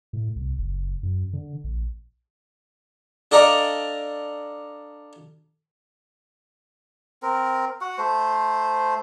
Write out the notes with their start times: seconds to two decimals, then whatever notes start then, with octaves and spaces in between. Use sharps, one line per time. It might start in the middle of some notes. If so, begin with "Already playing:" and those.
0.13 A2
0.36 C2
0.58 F#1
1.03 F#2
1.33 D3
1.64 A#1
3.31 D4 A4 D5 D#5 F5 A#5
7.23 C4 A#4
7.81 F#4 F#5
7.98 A3 C5